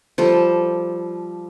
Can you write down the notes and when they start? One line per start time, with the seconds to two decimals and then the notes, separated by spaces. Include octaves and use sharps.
0.18 F3 G3 A4